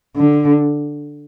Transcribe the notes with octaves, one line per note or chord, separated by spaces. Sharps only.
D3